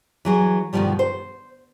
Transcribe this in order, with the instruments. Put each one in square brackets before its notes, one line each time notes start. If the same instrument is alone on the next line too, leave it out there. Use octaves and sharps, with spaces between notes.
[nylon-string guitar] E3 F#3 G#4
D2 G2 B2 D#3 F3 G3
C5